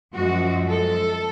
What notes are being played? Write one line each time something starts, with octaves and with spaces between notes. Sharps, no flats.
F#2 F3 G#3 F#4
A4